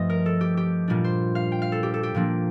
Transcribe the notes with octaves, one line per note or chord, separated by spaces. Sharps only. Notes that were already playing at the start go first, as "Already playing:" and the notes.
Already playing: G2 F3 A3 D#5
A#4
A4
G4
G4
A#2 G3 D4
C5
F5
G5
F5
A4
G4
A4
G4
A#2 F3 A#3 D4